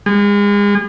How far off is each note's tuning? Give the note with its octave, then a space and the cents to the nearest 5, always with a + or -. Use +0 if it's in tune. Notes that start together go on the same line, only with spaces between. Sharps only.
G#3 -35